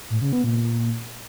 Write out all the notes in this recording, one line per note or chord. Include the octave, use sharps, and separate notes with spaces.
A2
C#3
B3
A#2